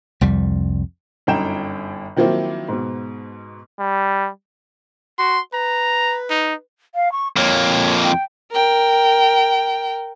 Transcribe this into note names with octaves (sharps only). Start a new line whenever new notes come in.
C2 F2 G3
G1 F#2 D#4 G5 G6 E7
D#3 F3 F#3 A#3 C4 E4
G#2 B2
G3
F#4 C6
B4 A#5
D#4
F5
C#6
F2 A#3 C#5
G5
A#4 G5